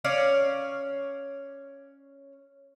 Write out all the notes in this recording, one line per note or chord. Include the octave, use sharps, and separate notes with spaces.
C#4 C#5 D5 F5